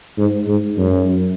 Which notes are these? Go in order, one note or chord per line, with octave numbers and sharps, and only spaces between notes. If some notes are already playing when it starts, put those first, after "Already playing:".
G#2
G#2
F#2